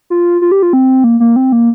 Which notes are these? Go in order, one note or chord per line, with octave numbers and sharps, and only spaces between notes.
F4
F4
G4
F4
C4
A#3
A#3
C4
A#3